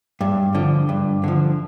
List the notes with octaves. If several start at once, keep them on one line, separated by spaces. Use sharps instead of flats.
G2
D3 F3
G2
D3 F3